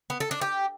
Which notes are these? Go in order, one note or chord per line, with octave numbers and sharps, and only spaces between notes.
B3
A4
D4
G4